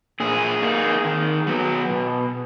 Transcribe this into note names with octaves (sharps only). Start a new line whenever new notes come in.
A#2 G#4
A#3 D#4
D#3
F#3 B3
B2